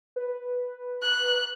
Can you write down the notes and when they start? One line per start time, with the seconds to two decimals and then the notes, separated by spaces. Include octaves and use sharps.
0.16 B4
1.02 F#6